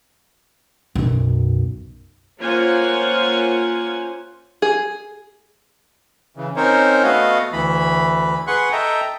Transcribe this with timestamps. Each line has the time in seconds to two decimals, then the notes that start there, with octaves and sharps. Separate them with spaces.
0.95 B1 F#2
2.39 A#3 C#4 F4 C5 F#5 G#5
4.62 G#4
6.37 C#3 E3
6.56 C4 C#4 D#4 A#4 C5 C#5
7.04 A3 B3 F#4 D#5 F5
7.53 D2 E3 B5
8.47 G#4 B4 F#5 C6 C#6 F#6
8.72 A4 D#5 E5 G5 A#5